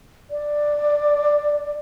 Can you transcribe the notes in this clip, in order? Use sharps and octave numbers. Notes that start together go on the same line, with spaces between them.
D5